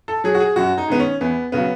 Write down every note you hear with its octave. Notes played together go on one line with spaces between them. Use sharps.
A4
F#3 G#4
F#4
G#4
F#2 F#4
D#4
D#3 G#3 B3
C#4
E2 B3
C#3 F#3 B3